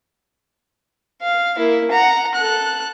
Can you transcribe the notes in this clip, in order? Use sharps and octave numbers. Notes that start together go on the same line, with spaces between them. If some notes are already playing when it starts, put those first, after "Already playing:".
F5
A#3 E4
F#5 A#5
A4 F#6